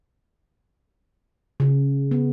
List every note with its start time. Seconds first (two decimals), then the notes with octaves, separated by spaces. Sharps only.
1.60 C#3
2.11 B3